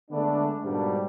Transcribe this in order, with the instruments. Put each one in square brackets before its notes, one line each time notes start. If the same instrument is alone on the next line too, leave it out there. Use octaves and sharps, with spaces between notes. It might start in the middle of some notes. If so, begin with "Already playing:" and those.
[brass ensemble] D3 G#3 A3 B3 D4
G#2 B2 G3 A#3 D4